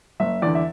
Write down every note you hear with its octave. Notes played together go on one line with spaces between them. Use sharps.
F#1 E5
E2 D3 D5
E5